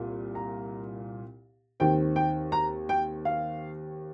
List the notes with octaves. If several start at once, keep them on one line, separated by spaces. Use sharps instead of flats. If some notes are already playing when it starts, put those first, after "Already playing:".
Already playing: C2 A#2
A#5
D#2 D#3 C4 G5
G5
A#5
G5
F5